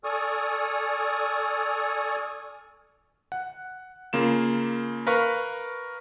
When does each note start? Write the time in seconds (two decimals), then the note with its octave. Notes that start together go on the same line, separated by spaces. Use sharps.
0.04 A4 D5 G#5 C#6 D#6 F6
3.32 F#5
4.13 C#3 A#3 F4 E7
5.07 A#4 B4 F5 C#6